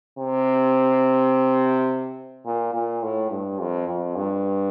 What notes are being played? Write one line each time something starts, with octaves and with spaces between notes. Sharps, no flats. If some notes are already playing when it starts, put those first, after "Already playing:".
C3
A#2
A#2
A2
G2
F2
F2
G2